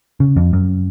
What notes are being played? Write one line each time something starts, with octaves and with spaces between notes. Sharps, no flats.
C#3
F2
F#2